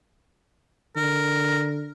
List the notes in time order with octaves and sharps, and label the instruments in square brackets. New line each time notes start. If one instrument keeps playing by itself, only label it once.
[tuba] D3 [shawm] A#4